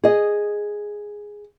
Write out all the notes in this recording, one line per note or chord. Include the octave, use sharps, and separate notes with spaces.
G#4 D#5